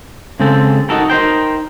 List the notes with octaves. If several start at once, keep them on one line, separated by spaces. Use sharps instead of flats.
C#3 G#3 C4 A4
D#4 F#4 A4 A#4
D#4 A#4 C5 G5